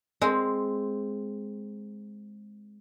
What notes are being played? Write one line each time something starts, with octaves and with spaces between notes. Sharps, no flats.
G#3 C4